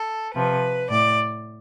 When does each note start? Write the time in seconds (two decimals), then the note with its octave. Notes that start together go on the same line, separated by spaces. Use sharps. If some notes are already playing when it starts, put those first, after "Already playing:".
Already playing: A4
0.35 C3 F3 B4
0.90 A2 D5